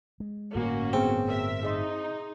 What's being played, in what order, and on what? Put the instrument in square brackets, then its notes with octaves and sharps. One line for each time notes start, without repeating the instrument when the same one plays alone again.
[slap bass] G#3
[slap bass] G1 A2 G3 [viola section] A#3 C#4 F#4
[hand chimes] B3 G#4 G5 [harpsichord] C4
[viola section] A#4 E5
[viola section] D#4 [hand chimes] G#4 D#5 C6